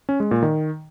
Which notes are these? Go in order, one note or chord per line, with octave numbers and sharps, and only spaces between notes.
C#4
G#3
A#2
D#3